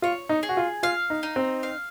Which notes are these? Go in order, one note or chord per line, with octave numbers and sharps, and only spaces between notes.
F4 C#5
D#4
G#4
F#4
F4
F4 F5
D#4
D#4
C4
F5